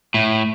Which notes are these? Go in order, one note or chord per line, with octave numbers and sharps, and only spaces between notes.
A2